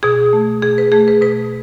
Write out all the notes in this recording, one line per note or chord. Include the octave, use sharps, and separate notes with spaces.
B2 G#4
A3
B2 G#4
B4
A3 G#4
B4
B2 B4